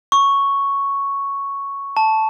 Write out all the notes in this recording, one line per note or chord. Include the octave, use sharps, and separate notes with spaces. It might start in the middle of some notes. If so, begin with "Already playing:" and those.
C#6
A5